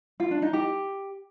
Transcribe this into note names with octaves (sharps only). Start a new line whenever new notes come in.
F4
D4
D#4
G4